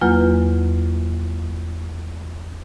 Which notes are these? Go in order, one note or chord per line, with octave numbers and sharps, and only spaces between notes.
E2 F#3 A#3 F4 B4 F6